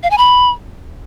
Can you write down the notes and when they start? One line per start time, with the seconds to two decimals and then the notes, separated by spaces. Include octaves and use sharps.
0.03 F5
0.11 G#5
0.18 B5